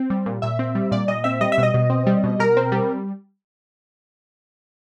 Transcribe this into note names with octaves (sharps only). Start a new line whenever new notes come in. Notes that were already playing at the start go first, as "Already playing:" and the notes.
Already playing: C4
G3
A#2
A#2 E5
C4
G3
A#2 D5
A#2 D#5
C4 E5
G3 D#5
E5
B2
D#5
B2
C4
G3
B2
B2 A#4
C4
G3